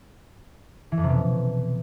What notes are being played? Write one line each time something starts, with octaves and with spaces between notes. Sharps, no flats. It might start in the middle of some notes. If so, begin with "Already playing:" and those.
E3
F2
C3
B2